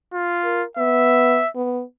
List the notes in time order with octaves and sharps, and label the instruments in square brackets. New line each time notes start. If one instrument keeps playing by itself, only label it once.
[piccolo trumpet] F4
[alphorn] A#4
[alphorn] B3 [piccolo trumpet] E5
[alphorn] B3